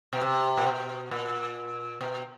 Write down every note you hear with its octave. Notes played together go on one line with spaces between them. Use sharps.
B2
C3
A#2
B2
A#2
B2